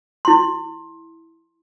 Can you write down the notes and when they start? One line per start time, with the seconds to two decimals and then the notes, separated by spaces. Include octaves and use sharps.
0.25 E4 C6